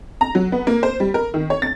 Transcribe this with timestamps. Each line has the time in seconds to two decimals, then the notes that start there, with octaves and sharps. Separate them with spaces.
0.21 A#5
0.35 F#3
0.52 B3
0.67 A#3
0.83 C5
1.00 G3
1.14 A#4
1.34 D#3
1.50 C#5
1.62 A6